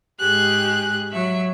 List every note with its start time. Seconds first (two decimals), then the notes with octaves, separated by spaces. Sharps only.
0.20 G#2 G4 G#4 F#6
1.11 F#3 E5